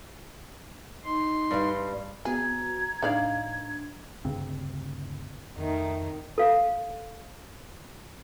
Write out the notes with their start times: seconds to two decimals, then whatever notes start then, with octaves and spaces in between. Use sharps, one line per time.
1.04 D#4 C6
1.51 G2 G3
2.25 B3 F#4 G#4 A#5 G#6
3.02 A2 D4 D#4 D5 F5
4.25 D2 G2 C#3 C4
5.57 F2 D#3 A3 D#4
6.38 A4 F5